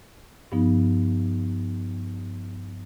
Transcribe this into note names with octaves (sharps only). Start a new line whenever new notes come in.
G2 F3 B3 D#4